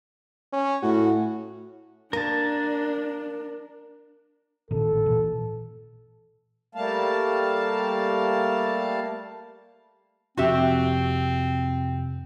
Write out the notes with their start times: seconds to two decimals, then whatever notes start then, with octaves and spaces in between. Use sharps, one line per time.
0.53 C#4
0.83 A2 F#4
2.13 A#3 D4 A#4 A5
4.71 A1 A#2 D#3 A4
5.06 A#2 E3
6.75 G3 A3 A#3 F5 A5
10.37 F2 C3 C4 F#4 G4 E5